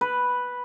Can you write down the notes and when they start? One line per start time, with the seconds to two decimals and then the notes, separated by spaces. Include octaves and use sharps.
0.01 B4